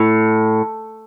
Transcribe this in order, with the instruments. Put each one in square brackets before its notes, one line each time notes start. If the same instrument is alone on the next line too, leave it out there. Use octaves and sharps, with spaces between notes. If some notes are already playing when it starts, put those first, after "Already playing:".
Already playing: [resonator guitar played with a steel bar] A2